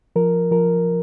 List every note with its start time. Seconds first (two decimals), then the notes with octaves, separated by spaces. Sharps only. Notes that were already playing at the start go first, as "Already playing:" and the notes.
0.16 F3 A#4
0.51 F3 A#4